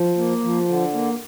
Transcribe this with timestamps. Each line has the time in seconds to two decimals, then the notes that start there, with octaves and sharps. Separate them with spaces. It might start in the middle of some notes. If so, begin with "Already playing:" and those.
Already playing: F3
0.18 A#3
0.43 F3
0.68 D3
0.94 A#3